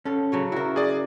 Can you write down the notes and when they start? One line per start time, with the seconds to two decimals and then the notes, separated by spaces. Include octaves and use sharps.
0.05 C#4 A4
0.32 C#3 F#3 C#5
0.52 E4 F#4 A#4
0.76 G#4 D5